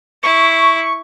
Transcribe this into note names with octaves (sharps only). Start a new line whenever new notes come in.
E4 C#6